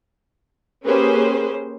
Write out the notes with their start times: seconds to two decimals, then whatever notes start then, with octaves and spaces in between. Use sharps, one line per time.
0.85 A#3 C#4 G4 G#4 B4 C5